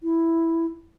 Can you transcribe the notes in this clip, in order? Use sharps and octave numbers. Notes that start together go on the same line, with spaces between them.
E4